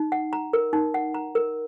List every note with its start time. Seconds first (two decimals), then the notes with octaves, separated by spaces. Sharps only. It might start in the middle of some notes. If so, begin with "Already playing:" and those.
Already playing: D#4
0.12 F#5
0.33 A#5
0.53 A#4
0.73 D#4
0.94 F#5
1.14 A#5
1.35 A#4